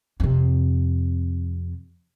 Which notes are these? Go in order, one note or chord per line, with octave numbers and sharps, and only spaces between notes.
F2 C3